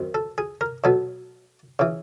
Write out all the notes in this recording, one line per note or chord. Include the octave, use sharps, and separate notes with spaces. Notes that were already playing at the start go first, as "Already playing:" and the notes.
Already playing: F#2 D#3 C4
A4
G#4
A#4
B2 F#3 B3 A4
C#3 E3